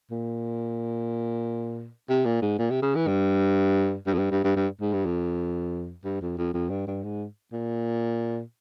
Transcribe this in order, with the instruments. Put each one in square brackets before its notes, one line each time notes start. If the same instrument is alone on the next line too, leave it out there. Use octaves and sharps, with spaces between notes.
[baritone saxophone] A#2
C3
A#2
G#2
A#2
C3
C#3
E3
G2
G2
F2
G2
G2
G2
G2
G#2
G2
F2
G2
F2
F2
F2
G2
G2
G#2
A#2